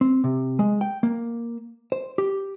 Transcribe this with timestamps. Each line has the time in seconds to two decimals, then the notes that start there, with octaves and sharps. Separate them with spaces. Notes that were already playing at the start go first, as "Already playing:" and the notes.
0.01 C4
0.24 C3
0.59 G#3
0.81 G5
1.03 A#3
1.92 C5
2.18 G4